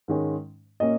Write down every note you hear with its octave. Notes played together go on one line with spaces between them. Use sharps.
G#2 D#3 G#3 C#4
A#2 A#3 C#4 D#5